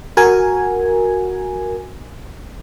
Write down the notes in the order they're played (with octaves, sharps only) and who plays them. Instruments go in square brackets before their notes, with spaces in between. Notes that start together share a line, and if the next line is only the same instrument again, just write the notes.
[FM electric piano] F#4 A#4 G#5